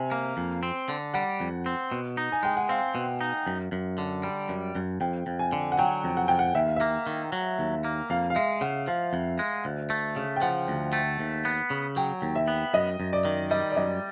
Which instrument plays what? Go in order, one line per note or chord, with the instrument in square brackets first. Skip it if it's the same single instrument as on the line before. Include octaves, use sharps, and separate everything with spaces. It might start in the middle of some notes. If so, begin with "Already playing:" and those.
Already playing: [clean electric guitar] C3 [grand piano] G#5
[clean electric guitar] A#3
F2
C4
D3
[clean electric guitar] G3 [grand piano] F#5
[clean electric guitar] F2
C4
B2
D#4
[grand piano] G#5
[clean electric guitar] G#3 [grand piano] G5
[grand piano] F#5
[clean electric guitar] C4 [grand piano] F5
[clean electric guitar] B2
D#4
F#2
F#2
D3
G3
F#2
F#2
[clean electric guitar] F2 [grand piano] G5
[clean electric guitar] F2
[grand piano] G#5
[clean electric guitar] D3
[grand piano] F#5
[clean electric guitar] F#3 [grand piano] G5
[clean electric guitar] F2
[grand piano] F#5
[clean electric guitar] F2 [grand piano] G5
[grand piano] F#5
[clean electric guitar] D#2 [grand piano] E5
[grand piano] F5
[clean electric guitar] A#3 [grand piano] E5
[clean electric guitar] D#3
F#3
D#2
A#3
[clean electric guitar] F2 [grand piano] F5
[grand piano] F5
[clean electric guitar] G#3 [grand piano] E5
[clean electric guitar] C#3 [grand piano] F#5
[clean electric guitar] F3 [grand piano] F5
[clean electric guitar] F2
G#3
D2
A3
C#3
[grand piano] G5
[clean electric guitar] F3 [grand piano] F#5
[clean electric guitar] D2
A3
D#2
B3
C#3
[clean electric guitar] F#3 [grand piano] G5
[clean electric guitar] D#2
[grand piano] E5
[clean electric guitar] B3
[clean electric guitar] F#2 [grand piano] D#5
[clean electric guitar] F#2
[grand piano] D5
[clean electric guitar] D#3
[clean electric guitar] G3 [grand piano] D#5
[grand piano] D5
[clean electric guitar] F#2 [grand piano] D#5